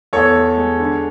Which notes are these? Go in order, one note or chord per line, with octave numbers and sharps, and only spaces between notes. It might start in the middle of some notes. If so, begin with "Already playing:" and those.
E2 A4 C#5
E2
G#3
D3